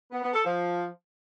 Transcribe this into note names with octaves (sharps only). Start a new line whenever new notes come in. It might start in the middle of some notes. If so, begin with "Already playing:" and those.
B3
B3
A4
F3